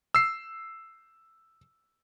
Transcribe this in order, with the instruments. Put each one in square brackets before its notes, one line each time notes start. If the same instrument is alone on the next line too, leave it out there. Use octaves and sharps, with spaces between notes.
[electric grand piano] E6 C7